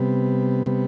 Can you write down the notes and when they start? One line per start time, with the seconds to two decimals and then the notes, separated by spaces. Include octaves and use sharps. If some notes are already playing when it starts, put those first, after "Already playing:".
Already playing: C3 G3 B3
0.66 C3 G3 B3